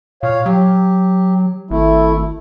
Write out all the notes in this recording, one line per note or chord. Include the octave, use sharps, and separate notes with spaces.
A#2 C#5 F5
F#3 G4
G#1 A3 E4